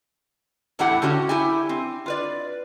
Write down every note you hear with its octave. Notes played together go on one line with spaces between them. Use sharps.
E2 A2 A3 E4 G4 F#5
D3 C#4 F#4 G4
E4 G4 G#5
C4
F4 B4 D5